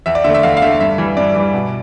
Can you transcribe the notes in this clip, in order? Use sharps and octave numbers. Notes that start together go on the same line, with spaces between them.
E2 E5
D5
D3 A3 E5
E5
E2 F5
F5
D3 A3 E5
G2 E5
E3 G3
G2 D5
E3 G3
B2